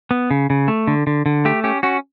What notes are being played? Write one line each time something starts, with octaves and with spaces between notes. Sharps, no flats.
B3
C#3
C#3
A3
D3
D3
D3
A3 G4
C#4 G4
C#4 F#4